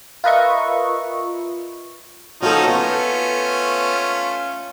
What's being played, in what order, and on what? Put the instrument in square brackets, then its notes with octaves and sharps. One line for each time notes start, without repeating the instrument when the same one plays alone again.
[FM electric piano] F4 A#4 B4 D#5 E5 C#6
[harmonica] F3 C#4 D#4 [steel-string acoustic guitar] F#4 A4
[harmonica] A3 C#4 F4 [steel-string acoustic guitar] B3